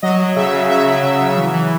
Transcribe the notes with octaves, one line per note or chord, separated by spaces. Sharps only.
F#3 D#5
F#3
C#3 E5
C#3
F#3 E5
F#3
C#3
C#3
E3
E3